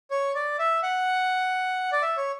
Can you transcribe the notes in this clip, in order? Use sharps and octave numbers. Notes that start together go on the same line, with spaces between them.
C#5
D5
E5
F#5
D5
E5
C#5